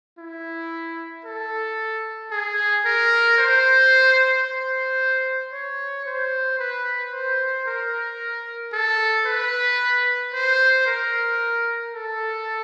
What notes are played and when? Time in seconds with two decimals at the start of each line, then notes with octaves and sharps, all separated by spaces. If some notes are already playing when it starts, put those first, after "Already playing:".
0.18 E4
1.25 A4
2.31 G#4
2.85 A#4
3.38 C5
4.45 C5
5.53 C#5
6.06 C5
6.59 B4
7.13 C5
7.66 A#4
8.73 A4
9.26 B4
10.34 C5
10.87 A#4
11.94 A4